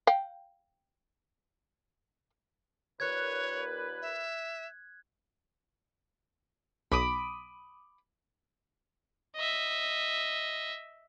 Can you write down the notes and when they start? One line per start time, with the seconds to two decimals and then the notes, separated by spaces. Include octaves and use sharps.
0.07 F5 G5
3.00 D#2 A#2 B4 C#5 F#6 G#6
4.02 E5
6.92 B1 B5 D6 D#6
9.36 D#5 E5